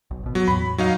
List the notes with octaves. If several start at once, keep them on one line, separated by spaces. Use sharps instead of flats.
B1
G#1 B2
F#3 B3
E2 A2 B5
F#3 D#4 F5